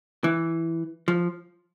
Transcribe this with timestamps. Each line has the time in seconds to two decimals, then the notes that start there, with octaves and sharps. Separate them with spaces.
0.24 E3
1.08 F3